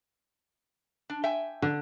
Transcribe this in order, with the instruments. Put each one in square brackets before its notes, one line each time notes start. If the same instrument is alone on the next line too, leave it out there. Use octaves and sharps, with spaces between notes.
[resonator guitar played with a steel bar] D4
E5 G5 G#5
[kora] D3